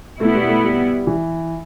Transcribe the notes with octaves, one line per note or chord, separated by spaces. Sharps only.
B2 A3 B3 E4
G3
A3
G3
E3